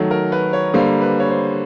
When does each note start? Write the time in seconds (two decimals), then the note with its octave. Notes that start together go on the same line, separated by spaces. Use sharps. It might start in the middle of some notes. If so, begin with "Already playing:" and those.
Already playing: D#3 F#3 A3
0.11 A#4
0.32 B4
0.53 C#5
0.74 D3 G3 A#3 C5
1.02 B4
1.20 C#5
1.30 C5